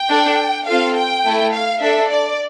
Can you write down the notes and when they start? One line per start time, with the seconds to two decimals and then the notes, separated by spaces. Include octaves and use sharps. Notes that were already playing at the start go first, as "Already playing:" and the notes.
Already playing: G5
0.10 D4 A4
0.67 C4 F4 A4 F5
0.96 G5
1.25 A3 E4 A4
1.54 F5
1.82 D4 A4 E5
2.10 D5